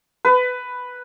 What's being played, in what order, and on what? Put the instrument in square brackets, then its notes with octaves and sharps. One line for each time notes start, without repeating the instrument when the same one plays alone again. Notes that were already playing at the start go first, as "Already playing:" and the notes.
[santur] B4